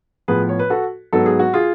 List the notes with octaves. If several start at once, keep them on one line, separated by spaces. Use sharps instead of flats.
A2 F3 B3 G#4 B4
C#5
B4
F#4 A4
G#2 F#3 B3 A4
G#4
F#4
F4 G#4